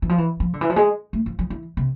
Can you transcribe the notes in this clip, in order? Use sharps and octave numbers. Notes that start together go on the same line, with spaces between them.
E3
F3
E3
F3
D3
E3
F3
G#3
A3
F3
F3
E3
C3